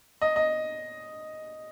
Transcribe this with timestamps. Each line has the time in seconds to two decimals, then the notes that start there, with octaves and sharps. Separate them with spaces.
0.22 D#5
0.36 D#5